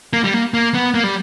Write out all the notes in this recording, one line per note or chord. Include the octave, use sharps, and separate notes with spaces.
A#3
G3
A#3
A#3
B3
A#3
G3